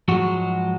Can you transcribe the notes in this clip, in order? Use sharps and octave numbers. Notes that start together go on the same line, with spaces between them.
G#2 F3 F#3 G#3 F#4